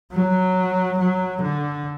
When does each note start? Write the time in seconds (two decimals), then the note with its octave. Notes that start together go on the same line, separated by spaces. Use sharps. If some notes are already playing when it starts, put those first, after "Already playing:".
0.12 F#3
0.98 F#3
1.41 D3